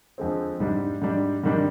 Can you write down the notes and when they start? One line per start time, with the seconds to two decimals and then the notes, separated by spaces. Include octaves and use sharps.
0.18 F2 D3 G#3 C4
0.60 G#2 G3 D4
1.02 G#2 G3 D4
1.44 G#2 D#3 G3 D4